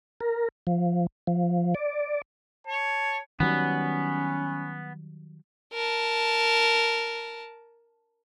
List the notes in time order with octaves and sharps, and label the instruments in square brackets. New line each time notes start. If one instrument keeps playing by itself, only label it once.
[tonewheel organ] A#4
F3
F3
D5
[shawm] C#5 [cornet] A5
[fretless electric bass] D#3 F#3 G3 [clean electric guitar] B3 [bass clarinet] C#4
[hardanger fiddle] A#4 A5